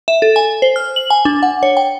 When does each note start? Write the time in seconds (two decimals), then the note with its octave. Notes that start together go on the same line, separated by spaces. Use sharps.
0.08 E5
0.22 A4
0.36 G#5
0.62 C5
0.76 F6
0.96 F#7
1.10 G#5
1.25 D4
1.43 F#5
1.63 C#5
1.77 G5